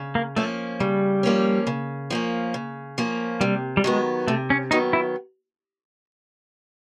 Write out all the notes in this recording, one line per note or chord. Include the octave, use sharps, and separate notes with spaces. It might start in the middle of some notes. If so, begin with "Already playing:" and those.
Already playing: C#3
A#3
F3 A3 A#3 C#4
C#3 G3
F3 A#3 C#4
C#3
F3 A#3 C#4
C#3
F3 A#3 C#4
C3 G3
G3
D#3 F#3 G#3 B3
C3 A3
C#4
D#3 F#3 B3 D#4
E4